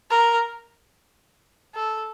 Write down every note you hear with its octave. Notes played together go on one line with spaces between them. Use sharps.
A#4
A4